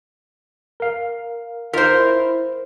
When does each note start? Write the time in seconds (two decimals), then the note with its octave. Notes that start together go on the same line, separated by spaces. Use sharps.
0.80 A#4 F5
1.73 D#4 F4 A#4 C5 B6
2.00 E4